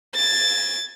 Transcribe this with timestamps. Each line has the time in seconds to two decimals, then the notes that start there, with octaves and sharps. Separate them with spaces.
0.15 G#6 A6